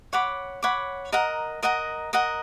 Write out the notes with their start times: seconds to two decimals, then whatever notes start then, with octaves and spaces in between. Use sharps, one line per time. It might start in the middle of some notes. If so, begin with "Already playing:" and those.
0.13 C#5 F#5 B5 D6
0.62 C#5 F#5 B5 D6
1.12 A#4 D#5 F#5 A#5
1.63 A#4 D#5 F#5 A#5
2.13 A#4 D#5 F#5 A#5